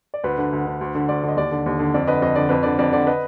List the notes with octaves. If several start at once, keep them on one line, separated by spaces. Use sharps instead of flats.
D5
D2 B4
D3
D2
D3
D2
D3
D2 D5
D3
D#5
D#2 D5
D3
D#2
D3
F2 D5
D3 B4 D#5
F2 D#5
D3 D5
F2 B4
D3 D5
F2 D5
D3 D5
B4 D#5